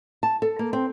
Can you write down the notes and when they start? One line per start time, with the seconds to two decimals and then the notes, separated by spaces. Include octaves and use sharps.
0.23 A5
0.42 A4
0.59 A#3
0.73 C4